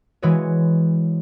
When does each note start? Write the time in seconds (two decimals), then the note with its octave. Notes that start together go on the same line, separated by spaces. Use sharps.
0.22 E3 G#3 F#4 B4 C#5